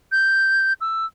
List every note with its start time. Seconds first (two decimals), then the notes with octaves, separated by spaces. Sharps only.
0.12 G6
0.81 E6